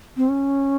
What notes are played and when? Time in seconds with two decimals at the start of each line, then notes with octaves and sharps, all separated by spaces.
0.17 C4
0.29 C#4